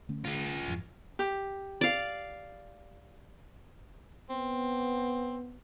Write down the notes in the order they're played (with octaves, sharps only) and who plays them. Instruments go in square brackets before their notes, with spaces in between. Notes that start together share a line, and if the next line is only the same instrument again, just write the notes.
[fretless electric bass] D3 A3 C#4
[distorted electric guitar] F4 G#4
[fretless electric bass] F2 G#2 F3
[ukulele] G4
[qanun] D5 F5
[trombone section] B3 [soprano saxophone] C4